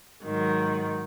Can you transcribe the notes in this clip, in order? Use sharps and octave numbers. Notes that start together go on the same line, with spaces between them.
G#2 D#3 F#3